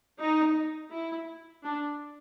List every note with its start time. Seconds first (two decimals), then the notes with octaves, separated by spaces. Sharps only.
0.20 D#4
0.91 E4
1.64 D4